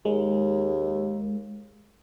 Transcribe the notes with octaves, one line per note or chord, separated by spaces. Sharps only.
D#2 G#3